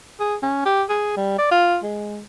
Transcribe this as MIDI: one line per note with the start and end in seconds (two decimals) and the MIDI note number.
0.20 0.35 68
0.42 0.65 61
0.65 0.83 67
0.89 1.13 68
1.17 1.36 55
1.39 1.50 74
1.51 1.77 65
1.83 2.21 56